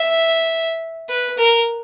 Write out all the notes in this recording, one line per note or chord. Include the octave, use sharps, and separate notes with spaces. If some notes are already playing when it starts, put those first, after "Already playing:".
Already playing: E5
B4
A#4